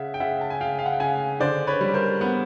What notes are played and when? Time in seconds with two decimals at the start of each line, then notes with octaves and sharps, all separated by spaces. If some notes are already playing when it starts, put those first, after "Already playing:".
Already playing: C#3 E5 F#5
0.14 G5
0.20 C#3 E5 F#5
0.41 A5
0.50 G#5
0.61 C#3 F5 G5
0.79 F5
0.86 F#5
0.93 G5
1.00 C#3 F#5 G#5
1.40 D3 C5 D5
1.67 B4 C#5
1.81 G3
1.94 A#4 C5
2.21 B3